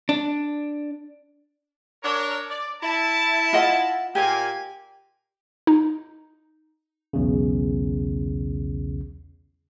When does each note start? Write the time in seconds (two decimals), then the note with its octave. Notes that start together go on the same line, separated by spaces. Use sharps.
0.09 D4
2.03 D4 A#4 C#5
2.49 D5
2.82 E4 A5
3.53 F4 D#5 F#5
4.15 A#2 A#3 G4 G#5
5.67 D#4
7.13 B1 E2 C#3